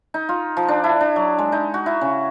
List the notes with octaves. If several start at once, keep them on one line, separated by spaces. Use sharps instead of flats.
D#4
F4
F3
D4
E4
D4
F#3
G#3
D#4
F#4
E4
C#3